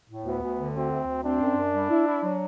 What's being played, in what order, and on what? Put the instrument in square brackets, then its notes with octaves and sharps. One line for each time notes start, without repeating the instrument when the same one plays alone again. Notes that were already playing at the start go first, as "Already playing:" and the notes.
[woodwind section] A2
[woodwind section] D2 [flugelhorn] B3
[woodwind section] D2
D3
[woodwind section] D2 [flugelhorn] C4
[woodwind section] D2
D2
[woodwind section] C4 [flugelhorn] D4
[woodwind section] F#2
F#2
G3
E4
E4
F#3